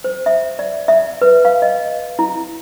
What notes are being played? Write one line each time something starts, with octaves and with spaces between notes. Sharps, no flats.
C5
E5
D5
E5
B4
F5
D#5
E4